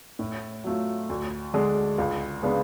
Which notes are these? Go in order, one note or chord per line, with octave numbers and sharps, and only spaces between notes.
A2
F#3 A3 F4
D2
D3 G#3 D4
C#2
C#3 G#3 B3 D4